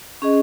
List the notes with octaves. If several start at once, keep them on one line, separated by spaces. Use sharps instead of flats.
C#4 G#4 D#5